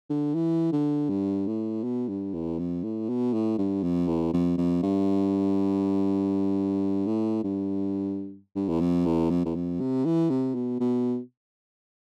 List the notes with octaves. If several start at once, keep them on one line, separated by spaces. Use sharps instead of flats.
D3
E3
D3
G2
A2
B2
G2
E2
F2
A2
B2
A2
G2
F2
E2
F2
F2
G2
A2
G2
G2
E2
F2
E2
F2
E2
F2
C3
E3
C3
B2
B2